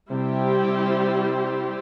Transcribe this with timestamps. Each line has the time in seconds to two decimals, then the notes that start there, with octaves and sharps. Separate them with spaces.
0.10 C3 G3 E4 G4 C5
0.63 C3